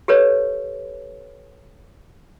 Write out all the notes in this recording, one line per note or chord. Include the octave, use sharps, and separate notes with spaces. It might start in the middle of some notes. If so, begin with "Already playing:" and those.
G4 A4 B4 C#5